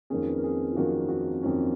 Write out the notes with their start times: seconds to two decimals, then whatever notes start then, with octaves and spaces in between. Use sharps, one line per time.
0.10 F2 D#3 A#3 C#4 G#4
0.29 B4
0.37 A#4
0.44 G#4
0.72 F4
0.76 F2 D#3 A#3 C#4 F#4
1.09 F#4
1.43 F2 D#3 A#3 C#4